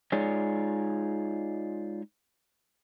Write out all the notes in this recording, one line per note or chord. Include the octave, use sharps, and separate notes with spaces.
G#3 D#4 F4 G#4 C#5 D5